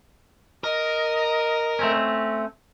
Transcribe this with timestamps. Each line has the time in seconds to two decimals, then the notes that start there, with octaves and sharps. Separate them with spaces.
0.64 A#4 D#5
1.79 A3 C4 C#4